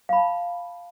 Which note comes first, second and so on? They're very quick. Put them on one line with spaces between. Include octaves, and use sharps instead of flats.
F5 B5 A5